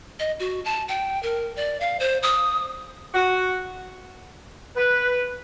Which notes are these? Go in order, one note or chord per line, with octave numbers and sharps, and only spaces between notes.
D#5
F#4
A5
G5
A#4
D5
F5
C5
D#6
F#4
B4